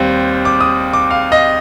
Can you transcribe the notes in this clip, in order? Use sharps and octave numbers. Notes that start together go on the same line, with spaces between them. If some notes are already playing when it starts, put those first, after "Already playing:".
Already playing: D#2 G3 C4
D6
D#6
D6
F5
D#5